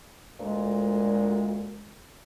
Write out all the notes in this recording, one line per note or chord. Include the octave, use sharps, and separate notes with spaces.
D2 A#2 G#3